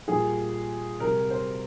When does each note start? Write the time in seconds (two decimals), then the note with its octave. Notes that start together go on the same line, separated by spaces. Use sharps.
0.08 A#2 G3 G#4
1.00 C3 G3 A#4
1.30 C5